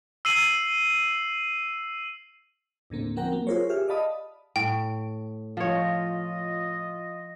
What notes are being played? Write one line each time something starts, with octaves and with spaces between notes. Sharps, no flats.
E6 C7 D#7 F#7
D#2 A2 D3 A#3 C4
F3 C4 A#4 F#5 G5 A#5
F#3 A#3
F4 G#4 A#4 C5 C#5
G4 G#4 E5 F6
D5 D#5 F5 A5 B5 D#6
A2 G5
F3 F4 C#5 D#5